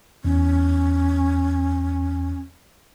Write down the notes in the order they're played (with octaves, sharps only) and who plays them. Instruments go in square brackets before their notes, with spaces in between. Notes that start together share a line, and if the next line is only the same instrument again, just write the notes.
[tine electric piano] E2 [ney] C#4